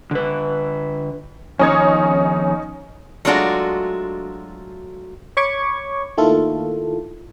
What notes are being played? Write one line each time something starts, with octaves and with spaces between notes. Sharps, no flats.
D3 B4
F2 D#3 C#4 D#4 C#5 G#6
F#3 G#3 A3 D4 F4 F#4
C#5 B5 C#6 D6 G#6
D#3 A3 A#3 E4 F4 A4